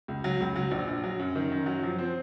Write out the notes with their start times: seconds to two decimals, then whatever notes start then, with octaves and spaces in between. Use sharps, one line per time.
0.08 C#2
0.24 F#3
0.40 C#2
0.56 F#3
0.71 A#1
0.87 A#1
1.04 F#3
1.19 F#2
1.36 D#3
1.52 F#2
1.66 F#3
1.83 F3
1.99 C4